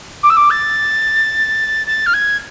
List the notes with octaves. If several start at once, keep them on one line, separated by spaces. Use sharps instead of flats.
D6
E6
D6
A6
A6
F6
G#6